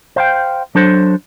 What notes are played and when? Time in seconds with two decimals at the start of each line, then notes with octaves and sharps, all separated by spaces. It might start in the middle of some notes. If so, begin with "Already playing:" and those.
0.16 C5 F5 G5
0.75 F#3 D4 A4 C5